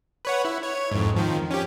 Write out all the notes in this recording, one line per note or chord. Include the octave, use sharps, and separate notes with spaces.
B4 C#5 F#5
E4
C#5
F2 G#2
D#3 F3
C#4 G4